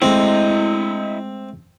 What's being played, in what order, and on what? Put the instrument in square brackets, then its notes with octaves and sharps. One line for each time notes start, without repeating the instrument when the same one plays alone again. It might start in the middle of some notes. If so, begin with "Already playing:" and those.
[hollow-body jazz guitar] G#3 A3 [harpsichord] C4 [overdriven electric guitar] E4 D#5